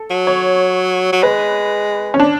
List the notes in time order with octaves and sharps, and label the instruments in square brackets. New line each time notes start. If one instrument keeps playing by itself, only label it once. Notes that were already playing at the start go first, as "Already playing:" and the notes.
Already playing: [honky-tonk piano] A4
[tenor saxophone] F#3
[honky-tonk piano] C#5
[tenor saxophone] F#3
[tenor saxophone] G#3 [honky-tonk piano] B4
[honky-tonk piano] C#4
D4